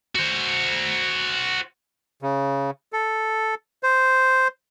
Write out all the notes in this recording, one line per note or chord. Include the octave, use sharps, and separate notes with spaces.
F#4 C5
C#3
A4
C5